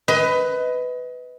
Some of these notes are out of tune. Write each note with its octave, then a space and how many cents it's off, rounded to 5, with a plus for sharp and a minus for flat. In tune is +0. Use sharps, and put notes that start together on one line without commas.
B4 +15 D#5 +25